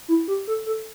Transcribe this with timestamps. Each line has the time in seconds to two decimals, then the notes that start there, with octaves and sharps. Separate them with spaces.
0.08 E4
0.28 G4
0.47 A4
0.66 A4